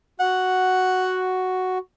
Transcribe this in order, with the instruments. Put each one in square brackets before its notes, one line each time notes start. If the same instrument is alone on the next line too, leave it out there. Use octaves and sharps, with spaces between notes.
[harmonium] F#4 [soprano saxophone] F#5